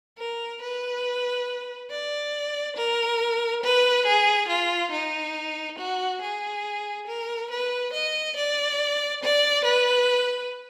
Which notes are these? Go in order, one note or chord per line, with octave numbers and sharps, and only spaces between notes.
A#4
B4
D5
A#4
B4
G#4
F4
D#4
F#4
G#4
A#4
B4
D#5
D5
D5
B4